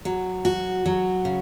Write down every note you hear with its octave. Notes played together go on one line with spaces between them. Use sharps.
F#3
F#4
F#3
C#3